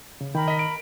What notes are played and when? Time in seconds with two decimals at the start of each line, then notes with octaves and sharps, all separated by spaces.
0.21 C#3
0.35 D#3 A#4 G5 B5
0.48 D#5 B6
0.59 D7